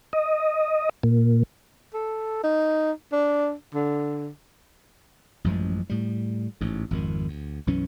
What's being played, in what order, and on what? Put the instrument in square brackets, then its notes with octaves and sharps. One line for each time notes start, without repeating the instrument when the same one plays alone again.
[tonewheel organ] D#5
A#2
[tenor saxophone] A4
D#4
D4
D3
[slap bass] A1 F#2 F3 G#3
A2 G3
A1 G#2
G#1 F2 D#3
D2
B1 F#2 E3 C#4